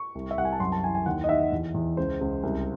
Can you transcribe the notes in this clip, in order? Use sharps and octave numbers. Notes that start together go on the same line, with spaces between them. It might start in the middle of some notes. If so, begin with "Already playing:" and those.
Already playing: C#6
C2
E5
C2 F#5
G#5
A5
F#2 C6
A5
E3 G#5
G#5
D#2 F#5
D#5
D#3 E5
E2
E2
C#2 C5
C#2
C2